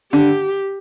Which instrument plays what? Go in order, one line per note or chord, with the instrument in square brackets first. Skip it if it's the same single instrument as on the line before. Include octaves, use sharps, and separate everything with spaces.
[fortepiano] D3 [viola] G4